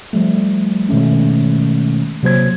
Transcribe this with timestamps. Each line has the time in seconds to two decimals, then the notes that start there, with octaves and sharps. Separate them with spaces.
0.13 F3 G3 A3
0.89 B2 D#3 G#3 A3 C#4
2.23 C3 F#3 A#3 C5 G#6